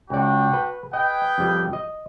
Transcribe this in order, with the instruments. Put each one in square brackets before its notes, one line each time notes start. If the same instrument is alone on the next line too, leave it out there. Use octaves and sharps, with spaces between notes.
[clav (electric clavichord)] C#2 D5 [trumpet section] D4 F#4 G5
[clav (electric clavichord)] B4
[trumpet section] G#4 B4 G5 [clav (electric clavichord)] D#5
[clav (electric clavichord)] F2 G3
D#5